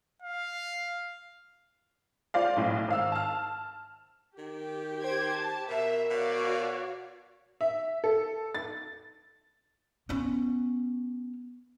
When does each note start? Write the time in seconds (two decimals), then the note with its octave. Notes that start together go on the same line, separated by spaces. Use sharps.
0.22 F5
2.34 F4 C5 D5 F5
2.56 B1 A2
2.88 G#1 F5 E6
3.12 A5 F6
4.38 D#3 G4
5.02 C5 G5 G#6
5.33 A5
5.70 B2 A#4 E5
6.11 B2 F#4 C#5 D5 F5
7.61 E5
8.04 A4
8.55 A6
10.09 B3 C#4